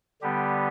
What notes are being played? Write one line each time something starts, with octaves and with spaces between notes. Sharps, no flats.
D3 G3 B3 G4